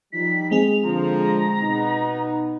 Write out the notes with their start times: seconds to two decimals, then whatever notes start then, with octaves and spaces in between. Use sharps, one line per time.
0.13 F3 G3 D#4 B6
0.51 G#3 C4 G#4 F7
0.83 D3 F3 A#5
1.61 B2 B3 D#4